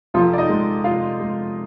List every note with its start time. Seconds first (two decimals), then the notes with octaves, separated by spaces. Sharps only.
0.14 F1 F3 F4
0.33 D5
0.38 D#4 D#5
0.49 G#3
0.84 F1 F4 F5
1.20 G#3